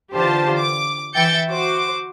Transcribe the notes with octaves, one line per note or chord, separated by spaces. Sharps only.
D3 E3 F4 G4 C5 A5
D6
E3 E5 G5 G6 A6 C#7
F#4 C5 D6